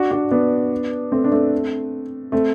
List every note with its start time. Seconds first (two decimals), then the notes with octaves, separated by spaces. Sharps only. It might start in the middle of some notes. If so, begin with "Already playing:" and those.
Already playing: D4 F#4
0.11 D4 F#4
0.31 B3 D4
1.12 A3 C4
1.24 D4
1.32 A3 C4
2.32 A3 C4